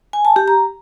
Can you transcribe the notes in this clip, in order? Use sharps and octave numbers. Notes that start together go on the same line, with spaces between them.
G#5
A5
G4
A#5